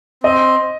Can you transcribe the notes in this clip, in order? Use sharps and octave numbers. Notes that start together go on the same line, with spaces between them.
C4 D#5